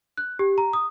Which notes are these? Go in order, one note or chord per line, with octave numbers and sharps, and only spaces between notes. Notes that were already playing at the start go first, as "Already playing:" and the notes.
F#6
G4
A#5
D#6